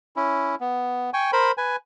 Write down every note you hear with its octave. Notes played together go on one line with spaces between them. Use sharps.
C#4 E4
B3
G5 G#5 C#6
A#4 C5 B5
B4 G#5